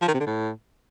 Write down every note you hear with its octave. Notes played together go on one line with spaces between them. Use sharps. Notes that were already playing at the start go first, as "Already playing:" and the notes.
F3
D#3
C3
D3
A2